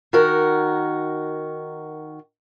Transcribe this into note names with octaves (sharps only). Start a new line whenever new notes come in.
D#3 F#4 A#4